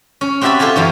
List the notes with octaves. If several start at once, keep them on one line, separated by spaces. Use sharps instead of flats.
C#4
C4 F#4 G4 E5 A5 B5
F4 G4 A4 F5 G#5
F#2 E3 C#4